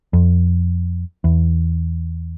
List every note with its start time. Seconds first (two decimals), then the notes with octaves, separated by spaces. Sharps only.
0.13 F2
1.24 E2